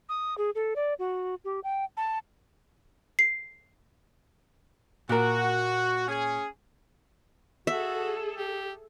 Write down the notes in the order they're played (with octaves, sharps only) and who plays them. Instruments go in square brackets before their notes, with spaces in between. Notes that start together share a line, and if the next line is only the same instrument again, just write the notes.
[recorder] D#6
G#4
A4
D5
F#4
G4
G5
A5
[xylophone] C7
[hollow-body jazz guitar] A#2 A#4 [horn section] F#4
[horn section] C#4 G#4
[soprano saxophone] F#4 [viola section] G#4 A4 [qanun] E5
[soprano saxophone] G4